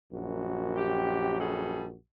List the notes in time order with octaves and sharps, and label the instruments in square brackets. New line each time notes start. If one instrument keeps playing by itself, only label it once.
[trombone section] A#1 F#2 F#4
[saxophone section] G4
G3 G#4 A4